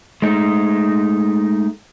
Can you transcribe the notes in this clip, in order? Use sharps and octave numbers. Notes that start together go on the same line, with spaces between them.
G#3 A3 D#4